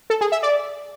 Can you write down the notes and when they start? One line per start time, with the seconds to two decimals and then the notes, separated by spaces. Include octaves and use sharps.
0.10 A4
0.21 G#4
0.32 E5
0.43 D5